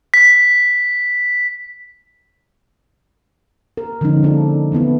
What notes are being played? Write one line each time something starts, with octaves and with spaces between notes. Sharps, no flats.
B6
A#4
D3 F3 G#3 C#4 D#4
A#3 D4 F4 A4
E3 A3 B3 E4